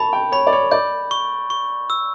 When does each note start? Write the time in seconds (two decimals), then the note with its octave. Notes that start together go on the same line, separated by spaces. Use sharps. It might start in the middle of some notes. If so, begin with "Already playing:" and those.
Already playing: A5 B5 C#6
0.13 G5
0.32 C#5 B5
0.47 D5
0.53 C#5
0.72 D5 G6
1.11 C#6
1.50 C#6
1.90 E6